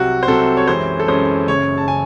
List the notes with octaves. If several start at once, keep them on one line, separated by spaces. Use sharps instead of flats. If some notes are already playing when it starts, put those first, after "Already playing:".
Already playing: C2 C3 F#3 F#4
C5
C2 C3 F#3 A4
C#5
F#2 E3 G#3 C#4 C5
A4
F#2 E3 G#3 C#4 C5
F#1 F#2 C#3 C#5
A5
C#3 G#5